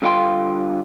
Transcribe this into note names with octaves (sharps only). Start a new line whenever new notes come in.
G2 D3 F4 F5 G5 C6